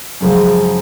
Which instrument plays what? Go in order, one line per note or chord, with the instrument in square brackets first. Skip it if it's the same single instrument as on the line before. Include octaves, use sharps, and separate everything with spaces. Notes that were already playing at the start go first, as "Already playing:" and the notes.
[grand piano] F#2 C#3 F3 G#3